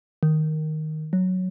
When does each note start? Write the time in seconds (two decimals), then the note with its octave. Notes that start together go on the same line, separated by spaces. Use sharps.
0.23 D#3
1.13 F#3